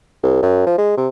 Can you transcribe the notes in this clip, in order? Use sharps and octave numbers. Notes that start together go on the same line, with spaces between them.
C2
F#2
F3
G#3
C3